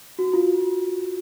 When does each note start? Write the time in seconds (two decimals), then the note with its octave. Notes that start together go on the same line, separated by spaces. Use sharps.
0.19 F#4
0.33 F4